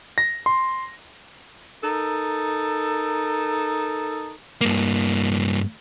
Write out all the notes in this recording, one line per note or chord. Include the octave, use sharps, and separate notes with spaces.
A#6
C6
D#4 A4 A#4
G2 A#3